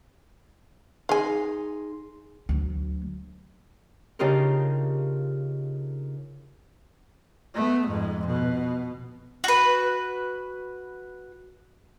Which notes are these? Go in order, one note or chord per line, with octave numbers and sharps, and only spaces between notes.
D#4 G#4 F5 G#5 C6
D2 F#3
C#3 D4 D#4 F4 G4 A#4
A3 B3
F2 G#2
B2
F#4 B4